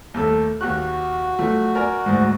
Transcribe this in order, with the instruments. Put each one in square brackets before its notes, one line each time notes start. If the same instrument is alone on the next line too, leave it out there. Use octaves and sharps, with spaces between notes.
[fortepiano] D#2 A3 A4
[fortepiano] D#2 G4 F#6 [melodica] F#4
[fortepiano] F3 F#3 A3
A#4 D5 G#5
D2 G#2